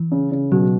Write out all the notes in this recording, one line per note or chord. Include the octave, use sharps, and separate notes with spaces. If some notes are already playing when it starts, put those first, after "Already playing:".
Already playing: E3
C#3
C#3
B2 F#3